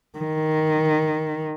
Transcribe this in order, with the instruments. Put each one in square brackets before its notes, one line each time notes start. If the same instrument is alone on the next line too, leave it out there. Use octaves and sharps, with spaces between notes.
[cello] D#3